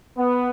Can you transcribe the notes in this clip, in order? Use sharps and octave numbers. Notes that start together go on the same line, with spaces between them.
B3